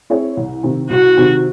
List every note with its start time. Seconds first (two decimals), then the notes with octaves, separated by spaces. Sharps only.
0.10 C4 E4 G#4 C#5
0.37 C2
0.63 C3 D#3
0.90 C2 F#4
1.17 C3 D#3